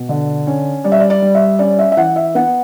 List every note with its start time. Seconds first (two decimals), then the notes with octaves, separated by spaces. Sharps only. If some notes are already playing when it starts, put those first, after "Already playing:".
Already playing: B2
0.09 D3
0.47 C#4
0.84 G3 D5
0.92 E5
1.00 D5
1.10 D5
1.22 G3
1.35 E5
1.59 C#4 D5
1.79 E5
1.92 E5
1.97 E3 F#5
2.16 E5
2.35 B3 F#5